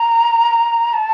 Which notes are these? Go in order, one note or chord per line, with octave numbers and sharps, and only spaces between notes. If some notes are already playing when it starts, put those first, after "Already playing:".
Already playing: A#5
A5